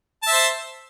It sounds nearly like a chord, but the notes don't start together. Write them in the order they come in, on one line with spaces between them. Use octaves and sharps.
A5 E5 C5